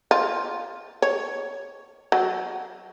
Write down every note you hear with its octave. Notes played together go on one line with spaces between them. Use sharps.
F4
C#5
F#3